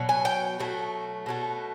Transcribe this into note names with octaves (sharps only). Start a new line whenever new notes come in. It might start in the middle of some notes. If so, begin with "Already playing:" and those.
Already playing: B2 F#3
G#5
G5
B2 F#3 A3
B2 F#3 A3